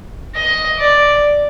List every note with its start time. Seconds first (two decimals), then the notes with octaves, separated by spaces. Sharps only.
0.35 D#5
0.79 D5